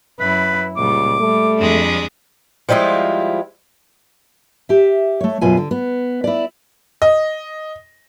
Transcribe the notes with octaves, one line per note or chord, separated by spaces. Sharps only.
F#2 E4 B4
C#2 A#2 G3 D6
G3 A3
F2 G#3 D4
F3 G3 G#3 E4 F4
G4 E5
A3 C#5
F#2 B2 F4 B4 G#5
D3
B3
E4 D5
D#5